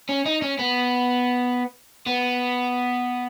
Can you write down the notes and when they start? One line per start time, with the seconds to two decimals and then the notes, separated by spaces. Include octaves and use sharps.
0.09 C#4
0.26 D#4
0.42 C#4
0.59 B3
2.07 B3